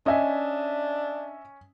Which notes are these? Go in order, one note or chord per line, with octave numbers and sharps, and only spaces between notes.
C#4 D4 D#5 E5 G#5